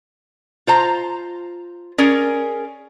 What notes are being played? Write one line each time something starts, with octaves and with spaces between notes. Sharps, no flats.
F4 C5 A#5
C#4 G#4 A#4 D5